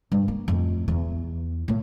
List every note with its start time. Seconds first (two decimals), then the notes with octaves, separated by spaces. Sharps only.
0.12 G2
0.28 A#3
0.48 F2 A2
0.88 E2
1.68 A2 A#3